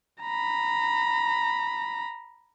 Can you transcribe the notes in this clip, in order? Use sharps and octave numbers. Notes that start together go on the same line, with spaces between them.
A#5 B5